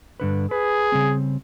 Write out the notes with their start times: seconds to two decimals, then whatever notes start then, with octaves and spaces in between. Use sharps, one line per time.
0.20 G2 D3 B4
0.51 G#4 B4
0.92 C#3 G3 C4